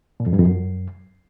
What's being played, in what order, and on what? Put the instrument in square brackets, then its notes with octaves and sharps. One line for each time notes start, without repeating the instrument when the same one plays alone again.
[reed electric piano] A#2
F2
G2
F2
F#2